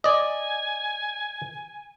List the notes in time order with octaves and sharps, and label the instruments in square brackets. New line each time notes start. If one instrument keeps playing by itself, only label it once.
[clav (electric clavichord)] D5 D#5 [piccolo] G#5